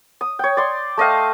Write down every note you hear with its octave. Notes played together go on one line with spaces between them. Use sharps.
D#6
C#5 G5
D5 C6
A3 D#5 F5 G5